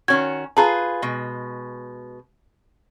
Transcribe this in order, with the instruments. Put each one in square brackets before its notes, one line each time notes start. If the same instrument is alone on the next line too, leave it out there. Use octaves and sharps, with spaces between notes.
[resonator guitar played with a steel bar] D#3 C#4 F#4 [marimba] G#6
[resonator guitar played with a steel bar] F4 G#4 B4 [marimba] A5 A#5
[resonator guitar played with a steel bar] B2 G#3